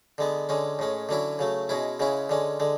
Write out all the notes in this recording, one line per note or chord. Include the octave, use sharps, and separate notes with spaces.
D3 G#3 B3
D3 G#3 C#4
A2 G#3 C#4
D3 F#3 C#4 E4
C#3 F#3 A3
B2 G#3 C#4 E4
C#3 G#3 C#4 E4
D3 G#3 C#4
D3 G#3